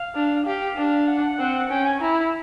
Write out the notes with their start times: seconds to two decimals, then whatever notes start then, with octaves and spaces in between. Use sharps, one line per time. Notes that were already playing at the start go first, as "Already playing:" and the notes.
Already playing: F5
0.15 D4
0.46 G4 F5
0.77 D4
1.08 F#5
1.39 C4
1.69 C#4 G5
1.85 G#5
2.00 E4 A#5